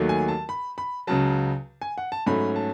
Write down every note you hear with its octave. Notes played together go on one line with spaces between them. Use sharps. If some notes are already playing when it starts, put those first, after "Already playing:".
Already playing: D#2 D#3 F#3 A3
G#5
A5
B5
B5
C#2 C#3 F#3 A5
G#5
F#5
A5
G#2 F#3 A3 C#4 B5
A5